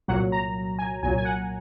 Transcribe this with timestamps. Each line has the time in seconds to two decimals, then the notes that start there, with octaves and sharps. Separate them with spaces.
0.08 C2 A#2 F#3 F#5
0.32 A#5
0.79 G#5
1.03 C2 A#2 F#3 G#5
1.18 G#5
1.25 F#5